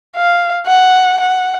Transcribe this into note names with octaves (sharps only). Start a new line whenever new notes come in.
F5
F#5
F#5